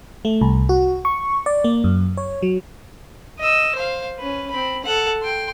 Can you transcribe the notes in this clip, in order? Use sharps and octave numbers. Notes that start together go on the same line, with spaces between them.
A3
C2
F#4
C#6
D5
A#3
F#2
C#5
F#3
D#5 E6
C5 F5
C#4 B4
C4 B5
A4 F#5
G5 C6